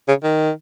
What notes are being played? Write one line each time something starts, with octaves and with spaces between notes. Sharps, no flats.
C#3
D#3